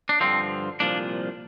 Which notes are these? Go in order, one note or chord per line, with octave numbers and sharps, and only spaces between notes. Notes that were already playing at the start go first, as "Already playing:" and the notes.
D4
G2 D3 F3 C4
C2 A#2 F3 D4